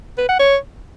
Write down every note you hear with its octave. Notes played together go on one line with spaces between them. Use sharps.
B4
F#5
C#5